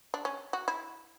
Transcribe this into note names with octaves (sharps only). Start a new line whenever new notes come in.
D4
C#4
F#4
E4